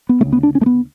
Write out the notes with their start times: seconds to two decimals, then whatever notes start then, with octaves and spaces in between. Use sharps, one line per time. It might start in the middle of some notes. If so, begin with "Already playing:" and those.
0.09 B3
0.20 C#3 A3
0.26 D2
0.33 B3
0.43 D4
0.55 C#4
0.61 A3
0.66 B3